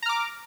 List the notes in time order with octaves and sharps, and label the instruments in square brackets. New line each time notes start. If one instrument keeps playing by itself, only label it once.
[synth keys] A#5
F6
D6